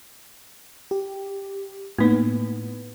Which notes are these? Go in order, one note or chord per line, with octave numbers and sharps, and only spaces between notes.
G4
A2 A#3 B3 D#4